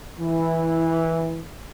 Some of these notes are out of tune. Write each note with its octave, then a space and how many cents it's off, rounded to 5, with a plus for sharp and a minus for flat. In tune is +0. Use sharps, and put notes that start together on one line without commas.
E3 -10 E4 +0